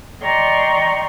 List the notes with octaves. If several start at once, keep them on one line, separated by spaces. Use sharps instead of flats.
D5 D#5 G5 A#5 C6 C#6